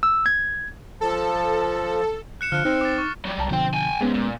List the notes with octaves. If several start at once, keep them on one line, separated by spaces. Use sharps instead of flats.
E6
G#6
F3 A4 A5
F#6 C#7 E7
D3 F3 F6 F#6
C4 D#4
D6 A6
C#6
F#3 G3
C2 A5 A#5
B2 D3 F3 C5 G5
G5 G#5
G#2 G#3 B3 C#4
A#2